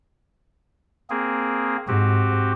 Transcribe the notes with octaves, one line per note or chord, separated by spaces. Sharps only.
A#3 C4 G#4
G#2 C4 F#4 G4